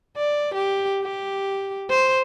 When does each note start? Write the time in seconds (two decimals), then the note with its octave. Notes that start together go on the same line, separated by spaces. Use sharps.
0.17 D5
0.54 G4
1.02 G4
1.90 C5